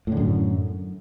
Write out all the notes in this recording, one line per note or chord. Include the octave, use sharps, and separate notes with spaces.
F#2 A2 D3